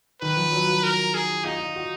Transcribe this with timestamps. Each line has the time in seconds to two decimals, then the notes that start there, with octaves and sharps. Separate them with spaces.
0.21 D#3 B4
0.37 F3
0.52 F#3
0.68 F#3
0.83 A#4
1.14 G#4
1.45 D#4 F4
1.60 F4
1.76 F#4